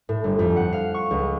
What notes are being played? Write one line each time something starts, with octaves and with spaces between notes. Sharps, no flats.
A2
G1
F2
F#5
F5
C#6
C#2